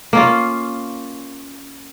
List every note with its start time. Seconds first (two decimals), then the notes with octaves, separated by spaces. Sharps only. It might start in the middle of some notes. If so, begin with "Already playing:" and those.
0.13 A#3 C#4 F4